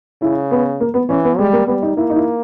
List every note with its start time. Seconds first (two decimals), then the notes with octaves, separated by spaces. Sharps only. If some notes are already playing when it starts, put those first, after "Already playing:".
0.21 C#3 E4
0.51 B3
0.80 A#3
0.94 B3
1.09 E3 C#4
1.24 B3
1.38 G3 G#3
1.53 A#3
1.67 G3 B3
1.82 D#4
1.97 A#3 E4
2.10 D#4
2.16 E4